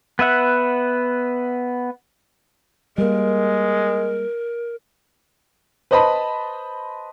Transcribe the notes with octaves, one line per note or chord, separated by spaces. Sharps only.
B3 B4 E5 F#5
G3 G#3 A#3 A#4
B4 C5 D#5 A5 B5